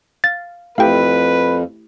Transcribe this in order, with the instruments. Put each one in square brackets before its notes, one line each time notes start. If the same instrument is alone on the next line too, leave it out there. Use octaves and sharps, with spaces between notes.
[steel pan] F5 [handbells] A6
[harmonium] F2 [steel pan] A3 E4 G4 [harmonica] B4 [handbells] F5 G5